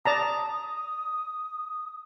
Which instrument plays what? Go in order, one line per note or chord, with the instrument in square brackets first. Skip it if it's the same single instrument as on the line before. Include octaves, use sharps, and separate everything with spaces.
[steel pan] D5 A5 A#5 [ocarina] D#6